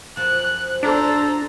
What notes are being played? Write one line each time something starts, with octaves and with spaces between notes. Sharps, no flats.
F#2 F3 F#6
D4 A4 C5 A#5